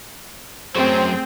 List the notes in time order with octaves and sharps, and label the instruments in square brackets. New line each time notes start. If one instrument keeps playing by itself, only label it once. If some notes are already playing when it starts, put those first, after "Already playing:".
[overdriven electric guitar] F#2 F#3 [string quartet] A3 G#4 G5 [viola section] C4 [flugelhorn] C5